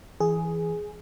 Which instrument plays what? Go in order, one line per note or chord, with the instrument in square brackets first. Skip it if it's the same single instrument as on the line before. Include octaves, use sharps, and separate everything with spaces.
[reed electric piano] E3 [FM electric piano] G#4